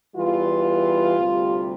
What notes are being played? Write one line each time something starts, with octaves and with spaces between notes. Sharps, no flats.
E2 E3 G3 F4
D2 C3 G3